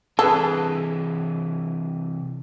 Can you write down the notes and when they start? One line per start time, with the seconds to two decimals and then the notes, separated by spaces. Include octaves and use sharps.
0.19 C3 E3 G#4 A4 B4